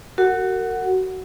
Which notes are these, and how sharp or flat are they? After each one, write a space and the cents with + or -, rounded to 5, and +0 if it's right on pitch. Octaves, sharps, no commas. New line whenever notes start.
F#4 +20 A#4 -40 F#5 +0